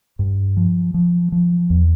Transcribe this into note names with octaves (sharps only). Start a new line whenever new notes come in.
G2
F3
F3
F3
E2